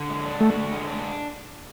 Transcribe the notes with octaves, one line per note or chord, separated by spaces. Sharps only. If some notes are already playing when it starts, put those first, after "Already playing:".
Already playing: D3
G#3
D4
A3 F#4
D3
G#3
D4